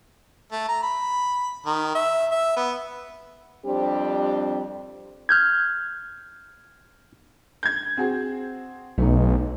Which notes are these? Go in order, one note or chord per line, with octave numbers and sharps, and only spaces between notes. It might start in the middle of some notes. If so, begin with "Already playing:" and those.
A3
A#5
B5
D#3
E5
E5
B3
F2 G3 C4 D4 G4
F6 G6 G#6
G6 G#6
C4 F#4 G#4
B1 A3 D#4